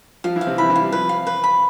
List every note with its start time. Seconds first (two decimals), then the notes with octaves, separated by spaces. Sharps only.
0.24 F3 F4 F5
0.36 E3 E4
0.41 F5
0.47 C3 C4
0.58 E3 E4 B5
0.70 E3 E4
0.76 F5
0.81 G3
0.92 F3 B4
1.09 F5
1.27 B4
1.44 B5